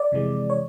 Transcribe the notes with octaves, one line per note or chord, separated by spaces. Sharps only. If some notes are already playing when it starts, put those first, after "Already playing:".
Already playing: D5
F2 C3 E3 G#3
C#5